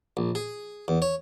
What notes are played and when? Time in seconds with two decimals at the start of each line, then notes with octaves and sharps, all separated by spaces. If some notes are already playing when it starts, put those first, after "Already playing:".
0.17 A#1
0.35 G#4
0.88 E2
1.02 C#5